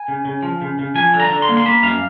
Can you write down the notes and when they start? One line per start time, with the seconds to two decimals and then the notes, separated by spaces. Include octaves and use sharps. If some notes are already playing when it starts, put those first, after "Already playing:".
Already playing: G#5
0.08 C#3
0.25 C#3
0.43 F3
0.61 C#3
0.79 C#3
0.95 F3 G#5
1.14 D3
1.20 A#5
1.30 D3
1.42 C6
1.49 A#3
1.57 C6
1.66 A#3 B5
1.83 F#2 F5